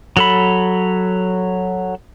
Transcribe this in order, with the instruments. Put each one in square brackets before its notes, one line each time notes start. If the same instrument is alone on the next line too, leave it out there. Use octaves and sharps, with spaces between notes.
[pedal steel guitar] F#3 A4 B5